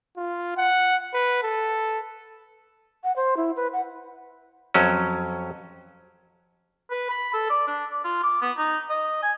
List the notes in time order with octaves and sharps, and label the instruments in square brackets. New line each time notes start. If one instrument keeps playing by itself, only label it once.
[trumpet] F4
F#5
B4
A4
[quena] F#5
C5
E4
B4
F#5
[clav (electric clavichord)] F2 F#3 C#4
[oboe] B4
B5
A4
D5
D4
D5
F4
D6
B3
D#4
D#5
G#5